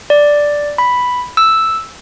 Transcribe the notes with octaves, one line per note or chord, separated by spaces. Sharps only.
D5
B5
E6